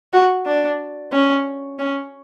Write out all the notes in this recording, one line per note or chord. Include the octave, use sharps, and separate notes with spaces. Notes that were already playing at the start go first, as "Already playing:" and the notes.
F#4
D4
C#4
C#4